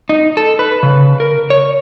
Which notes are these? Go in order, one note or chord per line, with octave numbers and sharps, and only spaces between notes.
D#4
A4
B4
C#3
A#4
C#5